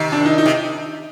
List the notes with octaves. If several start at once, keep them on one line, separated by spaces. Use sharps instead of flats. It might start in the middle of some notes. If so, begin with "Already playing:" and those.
Already playing: C3 D#3
D4
D#4
D#4
C3